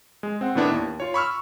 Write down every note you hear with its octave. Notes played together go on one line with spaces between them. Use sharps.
G#3
C4 F#5
A2 D#3 B3 D4 E4
D#2
F4 C#5
B5 C#6 E6 F6